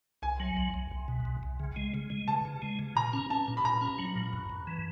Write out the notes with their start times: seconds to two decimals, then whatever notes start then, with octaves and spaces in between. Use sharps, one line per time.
0.22 C2 G#5
0.40 F#3
0.57 C2
0.74 C2
0.91 C2
1.08 B2
1.25 C2
1.43 C2
1.60 C#3
1.76 G#3
1.94 C#3
2.10 G#3
2.28 C#3 A5
2.45 C#3
2.62 G#3
2.79 C#3
2.95 A#2 A#5
3.13 C#4
3.30 C#4 A5
3.48 A#2
3.57 B5
3.64 A#2 A#5
3.81 C#4
3.99 F#3
4.15 A#2
4.33 F#2
4.49 F#2
4.67 E3